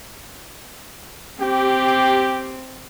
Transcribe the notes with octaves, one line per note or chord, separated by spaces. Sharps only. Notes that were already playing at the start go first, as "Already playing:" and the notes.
C4 G4 G5